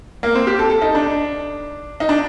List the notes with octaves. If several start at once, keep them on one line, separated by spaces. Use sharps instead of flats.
A#3
C4
G4
A4
A4
D#4
D4
D#4
D4